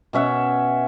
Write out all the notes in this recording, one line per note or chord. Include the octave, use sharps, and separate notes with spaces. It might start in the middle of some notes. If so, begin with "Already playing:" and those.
B2 C#4 E5 F#5